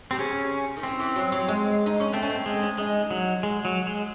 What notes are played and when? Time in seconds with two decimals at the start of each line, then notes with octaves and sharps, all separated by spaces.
0.11 C3 C4
0.19 C#3 C#4
0.76 D#3
0.83 E3 C4
1.00 E3
1.16 F#3
1.32 F#3
1.48 G#3
1.86 D#4
2.00 C#4
2.13 A3 C4
2.22 C#4
2.30 C4
2.45 G#3 C4
2.62 C#4
2.78 G#3 D#4
3.11 F#3
3.43 G#3
3.65 F#3
3.87 G#3